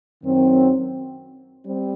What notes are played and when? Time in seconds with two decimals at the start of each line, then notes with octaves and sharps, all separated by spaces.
0.23 F#2 D#3 F#3 C4
1.65 G3 C4